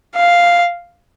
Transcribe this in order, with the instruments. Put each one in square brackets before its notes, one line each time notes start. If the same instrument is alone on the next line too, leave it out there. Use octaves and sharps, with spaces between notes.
[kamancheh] F5